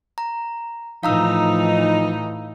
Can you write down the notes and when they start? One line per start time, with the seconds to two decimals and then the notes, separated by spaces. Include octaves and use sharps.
0.18 A#5
1.03 A2 E3 F3 D#4 F5 A#5 E6